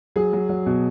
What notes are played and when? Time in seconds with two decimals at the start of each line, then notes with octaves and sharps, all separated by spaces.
0.16 F#3 G#4
0.33 F#3
0.49 F#3
0.66 B2